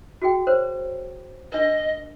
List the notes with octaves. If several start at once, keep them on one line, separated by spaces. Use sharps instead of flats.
F#4 G#4 G5
A#4 C5 C#5
D4 A#4 D#5